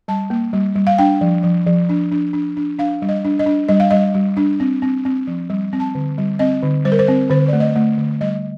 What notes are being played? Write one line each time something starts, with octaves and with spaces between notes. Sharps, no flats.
G3 A5
A#3
G3
G3
F5
D4 G5
F3
F3
F3
D4
D4
D4
D4
D4 F5
G3
D#5
D4
D#5
D4
G3 D#5
F5
G3 D#5
G3
D4
C4
C4
C4
F3
G3
C4
A5
D3
G3
C4 D#5
D3
G3 C5
A#4
C5
C4
D3 C5
A3 D5
D#5
A3
D3
G3 D#5